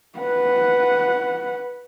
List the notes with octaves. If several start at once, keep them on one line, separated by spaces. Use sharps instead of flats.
B4 F#5